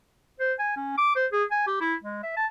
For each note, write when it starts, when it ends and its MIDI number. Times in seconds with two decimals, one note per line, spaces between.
0.40 0.53 72
0.59 0.72 80
0.77 0.97 61
0.98 1.13 86
1.16 1.26 72
1.33 1.44 68
1.51 1.66 80
1.67 1.80 67
1.81 1.95 64
2.04 2.19 56
2.23 2.33 76
2.37 2.46 81